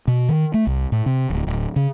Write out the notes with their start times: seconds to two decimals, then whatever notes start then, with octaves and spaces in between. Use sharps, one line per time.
0.08 B2
0.29 D#3
0.54 A3
0.67 C2
0.92 A2
1.06 C3
1.30 D1
1.47 D1
1.76 C#3